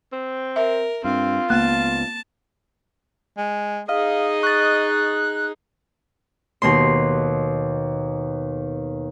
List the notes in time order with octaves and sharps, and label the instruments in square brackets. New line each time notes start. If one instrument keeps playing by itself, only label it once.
[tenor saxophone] C4
[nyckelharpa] A#4 [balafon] E5
[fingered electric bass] G2 [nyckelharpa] C4 [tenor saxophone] F4
[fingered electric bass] C#2 B3 [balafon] A#3 [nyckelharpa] A5
[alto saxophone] G#3
[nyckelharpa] D#4 G#4 [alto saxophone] D#5 [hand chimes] F5 F6
[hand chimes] C#6 A6 [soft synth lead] F#6
[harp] D#2 B2 C6